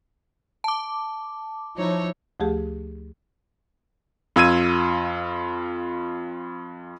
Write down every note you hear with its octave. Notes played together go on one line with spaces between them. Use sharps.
A5 D6
F3 D#4 E4 C#5
D2 F3 A3 G4 G#4
F2 F4 E6 G#6 D#7